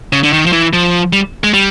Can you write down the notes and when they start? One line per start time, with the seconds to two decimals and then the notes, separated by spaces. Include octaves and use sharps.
0.13 C#3
0.24 D3
0.33 D#3
0.46 F3
0.53 E3
0.73 F3
1.13 G3
1.44 G#3
1.54 G3